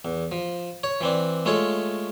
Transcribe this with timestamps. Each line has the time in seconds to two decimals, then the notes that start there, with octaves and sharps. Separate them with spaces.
0.05 E2
0.32 F3
0.84 C#5
1.01 E3 C4 D4
1.46 G#3 A3 F4 A4 C#5